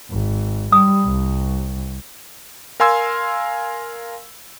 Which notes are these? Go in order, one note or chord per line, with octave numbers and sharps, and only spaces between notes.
G#1
G3 D#6
C2
A#4 F5 G#5 C6 E6 G#6